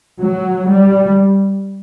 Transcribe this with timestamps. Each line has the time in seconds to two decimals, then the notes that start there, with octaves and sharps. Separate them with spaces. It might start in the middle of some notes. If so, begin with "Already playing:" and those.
0.23 F#3
0.67 G3